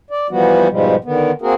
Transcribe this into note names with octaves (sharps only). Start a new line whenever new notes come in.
D5
E3 F3 G3 B3 F#4
G#2 B2 F3 G3 G#3
D3 D#3 B3
A#3 C4 F#4 G#4 A#4